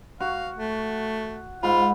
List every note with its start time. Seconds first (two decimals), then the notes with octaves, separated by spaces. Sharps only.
0.20 F#4 F5
0.57 A3
1.63 G#2 F4 B5